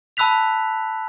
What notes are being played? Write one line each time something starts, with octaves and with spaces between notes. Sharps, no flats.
A5 B5 E6 F#6 B6 F7